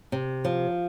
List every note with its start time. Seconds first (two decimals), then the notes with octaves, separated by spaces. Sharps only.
0.12 C3
0.45 F3